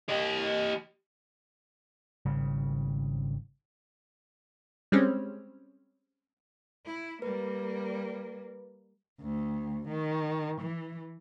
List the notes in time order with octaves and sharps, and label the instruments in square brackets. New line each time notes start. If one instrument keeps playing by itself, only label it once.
[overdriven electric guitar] G4 D#5
[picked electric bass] G#1 C#3 G3
[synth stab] G3 G#3 C4 C#4
[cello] E4
[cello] G3 A#3 [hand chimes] B4
[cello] D2
D#3
E3